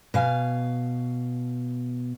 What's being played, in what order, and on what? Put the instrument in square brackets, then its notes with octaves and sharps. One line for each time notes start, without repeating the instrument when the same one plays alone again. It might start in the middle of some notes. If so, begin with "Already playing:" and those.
[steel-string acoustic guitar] B2 F5 G#5